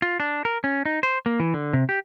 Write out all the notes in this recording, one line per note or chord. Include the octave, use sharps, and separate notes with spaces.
F4
D4
A#4
C#4
D#4
C5
A#3
E3
D3
C3
G4